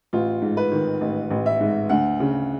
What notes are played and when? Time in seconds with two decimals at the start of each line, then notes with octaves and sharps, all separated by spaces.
0.13 A1 F4
0.42 G#2
0.57 B4
0.72 D#3
1.01 A1
1.31 A1
1.46 E5
1.60 G#2
1.89 D2 F#5
2.20 C#3